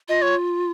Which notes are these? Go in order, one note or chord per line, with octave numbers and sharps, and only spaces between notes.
F4 D#5
C#5